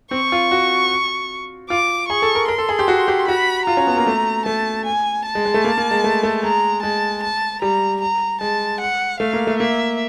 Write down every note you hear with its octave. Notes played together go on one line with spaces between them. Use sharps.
C4 C#6
F4
F#4
F4 D6
G#4 C#6
A4
A#4
A#4 C6
A4
G#4
G4
F#4
G4
F#4 B5
F4 A#5
C#4
B3
A#3
A3
A3 A5
G#5
A5
G#3
G#3
A3
A#3
A#3
G#3
A3
A3
G#3 A#5
G#3 A5
A5
G3 A#5
A#5
G#3 A5
F#5
A3 F5
A#3
A3
A#3 E5